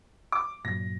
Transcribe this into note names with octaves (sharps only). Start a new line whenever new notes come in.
D6
G2 A#2 F#3 A#6